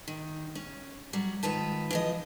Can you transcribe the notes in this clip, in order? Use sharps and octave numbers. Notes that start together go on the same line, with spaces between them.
D#3
C#4
F#3 G3
G#2 D#3 F4 B4 A5
E3 F3 D#5